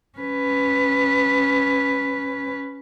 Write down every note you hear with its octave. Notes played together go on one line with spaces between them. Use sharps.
C#4 B4